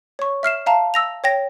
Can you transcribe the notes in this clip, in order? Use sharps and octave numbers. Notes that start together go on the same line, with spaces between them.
C#5 C#6
E5 F6 C7 E7
E5 F5 A5 A#5
E6 A#6 F7
C#5 G5 A#6